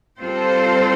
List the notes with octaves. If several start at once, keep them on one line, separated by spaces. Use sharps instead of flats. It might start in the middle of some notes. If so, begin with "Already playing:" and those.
G3 C4 F4 A4 C5